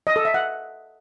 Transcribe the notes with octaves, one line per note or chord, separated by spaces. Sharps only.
D#5
A4
E5
F#5